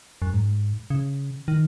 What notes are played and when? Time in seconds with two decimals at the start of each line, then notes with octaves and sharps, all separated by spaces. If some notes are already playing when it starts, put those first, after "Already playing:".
0.22 F#2
0.33 G#2
0.90 C#3
1.48 D#3